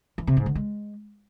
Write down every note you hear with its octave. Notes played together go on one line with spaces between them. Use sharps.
E3
C3
G#2
D3
G#3